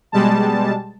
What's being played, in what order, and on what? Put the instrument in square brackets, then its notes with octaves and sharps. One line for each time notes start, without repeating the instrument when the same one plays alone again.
[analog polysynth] B2 G3 G#3 A5